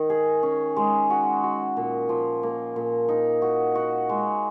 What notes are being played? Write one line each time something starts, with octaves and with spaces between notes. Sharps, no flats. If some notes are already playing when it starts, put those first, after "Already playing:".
Already playing: D#3 D#4
G#4
C#4
G#3
F#4
F#4
A#2
F3
A#3
A#2
D#4
F#4
F#4
G#3